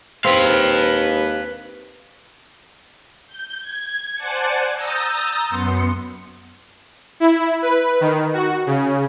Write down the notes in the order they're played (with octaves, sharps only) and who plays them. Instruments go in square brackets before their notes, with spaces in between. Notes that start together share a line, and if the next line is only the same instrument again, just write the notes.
[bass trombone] D#2 [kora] C4 [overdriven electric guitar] B4 F5
[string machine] G6
G#6
C5 D5 F#5 G#5 A5 C#7
A#5 D#6 E6 G6 A6 A#6
F#2 B3 C6 C7 C#7
[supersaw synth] E4
B4
D#3
F#4
C#3